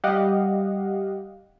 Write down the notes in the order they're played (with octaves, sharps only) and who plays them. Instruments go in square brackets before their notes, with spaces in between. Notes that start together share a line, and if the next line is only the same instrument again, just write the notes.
[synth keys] G3 G4 D#5 F5 F#5